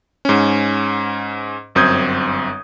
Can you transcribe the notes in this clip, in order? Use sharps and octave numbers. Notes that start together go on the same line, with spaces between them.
G#2 C#4
G1 F#2 C4 D#6 G6 G#6